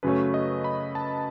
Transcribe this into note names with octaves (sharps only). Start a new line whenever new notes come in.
F#2 C#3 F#3 A3 C#4 B4
D#5
B5
A5